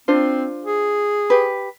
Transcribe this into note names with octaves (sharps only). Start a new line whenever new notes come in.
C4 D4 F4 C5
G#4
G4 B4